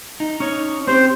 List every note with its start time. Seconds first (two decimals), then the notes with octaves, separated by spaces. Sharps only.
0.20 D#4
0.40 C#4 D#4 C#5
0.87 C4 G4 C5